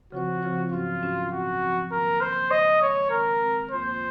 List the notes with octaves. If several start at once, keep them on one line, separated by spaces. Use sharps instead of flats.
C#3 F3 C4 F4 F#4 C5
C#3 F3 C4 F4 C5
G#2 F#3 C#4 F4 F#4
G#2 F#3 C#4 F#4
A#2 F3 C4 F#4
A#2 F3 C4
D#3 A#3 C#4 A#4
D#3 A#3 C#4 C5
C#3 G#3 C#4 D#5
C#3 G#3 C#4 C#5
D#3 G#3 C4 A#4
D#3 G#3 C4
F#2 F3 A#3 F4 C5